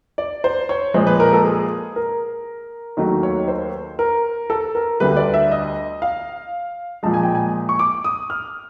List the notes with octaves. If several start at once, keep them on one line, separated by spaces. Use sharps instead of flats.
D5
C5
C#5
A#2 F3 G#3 C5
B4
A#4
A4
G#4
A#4
D#2 D#3 F#3 A3
C#5
C5
A#4
A4
A#4
D2 D3 G3 B4
D5
E5
D#5
F5
A#2 F3 G#3 A5
G#5
G5
G#5
C#6
D6
D#6
F6